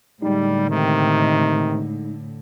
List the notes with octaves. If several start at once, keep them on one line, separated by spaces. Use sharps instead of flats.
A2 D3 G3 G#3 D#4
C3 D#3